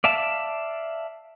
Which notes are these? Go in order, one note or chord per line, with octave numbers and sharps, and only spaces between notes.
D5 E5 F5 A5